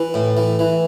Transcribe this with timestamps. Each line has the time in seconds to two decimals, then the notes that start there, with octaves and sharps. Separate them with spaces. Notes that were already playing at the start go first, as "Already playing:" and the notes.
Already playing: E3
0.14 A2
0.37 E3
0.59 E3